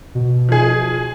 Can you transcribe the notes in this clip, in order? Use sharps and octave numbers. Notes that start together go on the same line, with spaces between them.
B2
F3 G#4